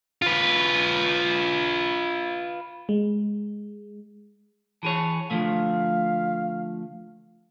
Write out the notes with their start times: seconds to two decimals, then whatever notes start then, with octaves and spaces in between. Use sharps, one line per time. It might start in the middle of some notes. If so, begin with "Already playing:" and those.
0.22 F4 B4
2.89 G#3
4.83 E3 G#4 C#5 A5
5.31 D3 F3 A3 F5